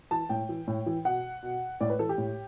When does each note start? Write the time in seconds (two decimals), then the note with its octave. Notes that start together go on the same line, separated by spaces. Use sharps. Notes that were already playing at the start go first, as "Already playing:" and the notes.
0.11 E3 A5
0.29 A2 G5
0.49 E3
0.68 A2
0.86 E3
1.05 B2 F#5
1.43 B2
1.81 A2 D5
1.90 B4
1.99 E3 A4
2.09 G4
2.18 A2